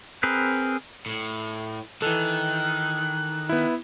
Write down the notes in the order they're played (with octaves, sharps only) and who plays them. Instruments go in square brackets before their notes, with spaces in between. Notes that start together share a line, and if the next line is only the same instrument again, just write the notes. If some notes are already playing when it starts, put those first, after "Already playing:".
[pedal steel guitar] C4 G#4 A#4 B4
[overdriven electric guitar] A2
[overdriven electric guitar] D#3 [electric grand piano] E3 A4 [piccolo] F#6
[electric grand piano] B3 E4